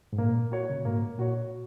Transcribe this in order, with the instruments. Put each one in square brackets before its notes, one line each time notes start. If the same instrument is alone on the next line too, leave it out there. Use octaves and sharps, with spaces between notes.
[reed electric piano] G#2
[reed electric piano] A#2 [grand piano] A#3
[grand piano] F#4 C#5
[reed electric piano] C#3
A#2
[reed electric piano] G#2 [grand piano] A#3
[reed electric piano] A#2 [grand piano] F#4 C#5